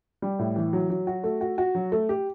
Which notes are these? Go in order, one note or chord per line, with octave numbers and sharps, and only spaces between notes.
G3
A2
E3
F#3
F#3
F#4
A3
F#4
F#4
F#3
A3
G4